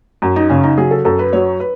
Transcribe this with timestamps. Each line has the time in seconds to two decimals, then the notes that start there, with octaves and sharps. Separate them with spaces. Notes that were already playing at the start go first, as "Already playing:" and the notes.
0.22 F#2
0.36 D#4
0.50 C#3 C#4
0.63 D#4
0.78 F#3 G#4
0.91 A4
1.05 F#2 A4
1.19 B4
1.33 F#3 C#5
1.60 B4